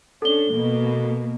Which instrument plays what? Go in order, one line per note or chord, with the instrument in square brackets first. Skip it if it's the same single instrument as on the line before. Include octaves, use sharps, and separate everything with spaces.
[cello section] C#4 D4 [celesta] A4 G7
[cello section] B2 A#3